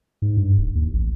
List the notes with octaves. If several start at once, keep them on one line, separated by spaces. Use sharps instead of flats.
G#2
G2
D1
D#2
A1